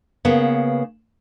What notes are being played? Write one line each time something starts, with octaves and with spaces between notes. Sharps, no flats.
C#3 A#3 B3